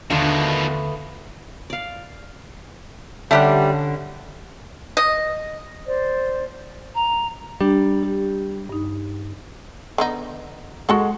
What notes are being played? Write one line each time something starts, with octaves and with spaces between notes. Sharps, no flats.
D#2 B2 D3 D#3 A3 B3 D4 F4
D5 F5
D3 G3 A3 C#4 G4 F#5
D#5
C5 D5
A#5
G3 D4
G4
G2 D#4
D3 B3 D#4
G#3 F#4 A4 F#5